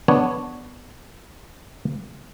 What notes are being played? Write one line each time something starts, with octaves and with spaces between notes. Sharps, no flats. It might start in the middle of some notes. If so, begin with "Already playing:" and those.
B3 D4 C#5